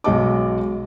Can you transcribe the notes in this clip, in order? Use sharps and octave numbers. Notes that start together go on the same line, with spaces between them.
B1 G#3 F#4 D#5 A5 D6